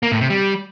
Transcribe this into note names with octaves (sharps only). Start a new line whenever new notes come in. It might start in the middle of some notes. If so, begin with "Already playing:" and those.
A#3
A2
C3
G3